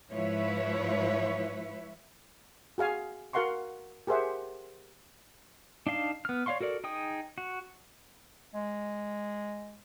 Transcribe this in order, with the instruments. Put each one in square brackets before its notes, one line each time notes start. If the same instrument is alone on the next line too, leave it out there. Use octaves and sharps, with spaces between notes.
[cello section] G#2 F3 E4 B4 C#5
[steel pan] F#4 G#4 F5 G#5
F#4 A#4 F5 F#5 C6 C#6
G4 G#4 A#4 C5 E5 F#5
[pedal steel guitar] D4 D#4 F5 A5
B3 F6
C#5 D5 F5 C6 C#6
F#4 A4 A#4 D5
D#4 G#4 G5 D#6
F#4
[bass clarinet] G#3